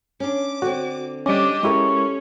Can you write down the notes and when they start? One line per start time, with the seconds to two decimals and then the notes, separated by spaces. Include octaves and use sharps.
0.20 C#4 D4 D6
0.62 D3 C4 F#4
1.26 G3 C#4 D4 G4 D#5 D6
1.63 G#3 C#4 E4 G4 A4 A#4 D#5 C#6